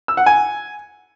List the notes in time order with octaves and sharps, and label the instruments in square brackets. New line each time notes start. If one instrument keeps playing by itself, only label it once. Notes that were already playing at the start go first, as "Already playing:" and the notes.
[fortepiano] E6
F#5
G#5